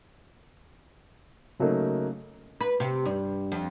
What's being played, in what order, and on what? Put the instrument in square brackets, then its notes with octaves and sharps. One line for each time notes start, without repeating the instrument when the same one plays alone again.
[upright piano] C#3 F#3 A3 A#3 D#4
[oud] B4
C3
G2
F2